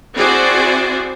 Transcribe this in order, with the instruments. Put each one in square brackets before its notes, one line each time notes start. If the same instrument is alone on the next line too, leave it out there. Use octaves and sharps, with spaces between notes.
[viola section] C4 E4 F#4 G#4 C5 D5